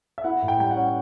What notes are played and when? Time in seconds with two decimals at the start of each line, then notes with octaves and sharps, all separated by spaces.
0.18 E5
0.24 E4 F#5
0.42 A2
0.48 G5
0.59 G3 G5
0.71 C#4 F#5